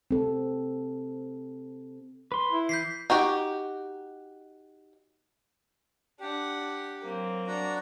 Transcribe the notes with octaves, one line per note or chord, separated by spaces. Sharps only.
C4 A4
B4 C6
E4
E3 G6 B6 C7
D#4 F#4 G4 G5
D4 G4 F#5
F#3 A#3 C4
D4 F#4 A#5